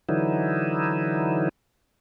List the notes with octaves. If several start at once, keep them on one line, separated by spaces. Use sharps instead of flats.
D3 E3 F#3 D#4 E4